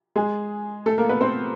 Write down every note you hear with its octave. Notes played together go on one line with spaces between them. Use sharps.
G#3 G#4
A3 A4
A#3 A#4
B3 B4
C4 C5